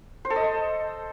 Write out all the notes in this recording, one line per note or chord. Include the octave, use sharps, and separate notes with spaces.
C5
A4
D#5